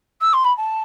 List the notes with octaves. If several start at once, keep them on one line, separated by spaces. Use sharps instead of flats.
E6
C6
B5
A5